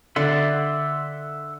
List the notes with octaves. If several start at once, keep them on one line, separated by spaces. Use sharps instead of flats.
D3 D5 E5 F#5 C6